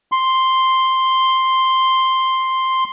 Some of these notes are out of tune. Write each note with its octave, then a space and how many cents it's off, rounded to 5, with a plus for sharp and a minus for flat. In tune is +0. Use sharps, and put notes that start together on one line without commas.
C6 +0